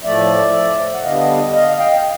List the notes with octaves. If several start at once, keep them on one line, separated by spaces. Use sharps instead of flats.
A2 F3 A3 D5 E5
F#5
D3 G3 B3 D4 D#5 F5
D#5 F5
F5 G5